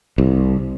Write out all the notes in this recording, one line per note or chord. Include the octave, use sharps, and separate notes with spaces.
C2